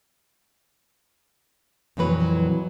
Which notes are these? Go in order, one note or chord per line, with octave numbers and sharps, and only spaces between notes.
F2 A#2 E3 F#3 B4